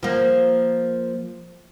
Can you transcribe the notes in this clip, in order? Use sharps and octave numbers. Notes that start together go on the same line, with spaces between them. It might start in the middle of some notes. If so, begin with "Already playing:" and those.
F3 A#3